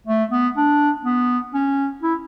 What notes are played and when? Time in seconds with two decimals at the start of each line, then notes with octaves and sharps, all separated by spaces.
0.07 A3
0.32 B3
0.57 D4
1.05 B3
1.54 C#4
2.03 E4